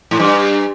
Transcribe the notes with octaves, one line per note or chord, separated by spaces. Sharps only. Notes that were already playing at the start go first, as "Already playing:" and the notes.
A2
G2